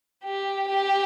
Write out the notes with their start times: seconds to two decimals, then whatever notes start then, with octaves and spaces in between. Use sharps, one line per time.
0.25 G4
0.68 G4